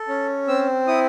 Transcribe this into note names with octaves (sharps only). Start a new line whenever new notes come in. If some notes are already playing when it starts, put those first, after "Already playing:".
Already playing: A4
C#4
C4 E6
E4 D#6